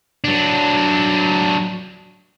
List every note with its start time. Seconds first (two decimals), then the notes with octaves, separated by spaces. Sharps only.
0.24 F#3 D4